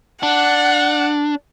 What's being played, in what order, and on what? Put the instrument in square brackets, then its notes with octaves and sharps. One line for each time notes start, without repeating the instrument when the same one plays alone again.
[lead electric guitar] D4 [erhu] F#5